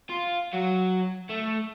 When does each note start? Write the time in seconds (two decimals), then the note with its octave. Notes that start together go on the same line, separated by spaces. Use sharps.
0.10 F4
0.53 F#3 F#4
1.29 A3